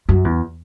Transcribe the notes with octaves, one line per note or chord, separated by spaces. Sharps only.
F#2
E2